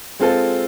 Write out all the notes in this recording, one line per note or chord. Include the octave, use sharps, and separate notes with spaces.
G#3 C4 F4 A4